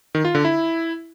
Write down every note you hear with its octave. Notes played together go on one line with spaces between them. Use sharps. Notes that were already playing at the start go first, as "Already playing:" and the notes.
D#3
F4
D3
E4